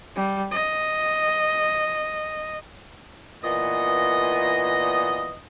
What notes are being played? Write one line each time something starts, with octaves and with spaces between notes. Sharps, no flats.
G3
D#5
A#2 E3 B3 D#5